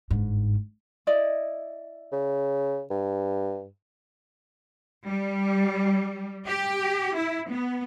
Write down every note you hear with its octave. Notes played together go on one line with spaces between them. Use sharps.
G1 G#2
E4 D5 D#5
C#3
G2
G3
G4
E4
B3